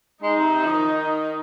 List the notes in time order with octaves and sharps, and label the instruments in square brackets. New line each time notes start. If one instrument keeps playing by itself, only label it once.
[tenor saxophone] G#3 [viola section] D#4
[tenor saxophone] C3
C3
F3
D#3